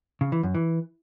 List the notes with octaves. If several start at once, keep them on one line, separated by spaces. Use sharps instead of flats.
C#3
E3
F#2
E3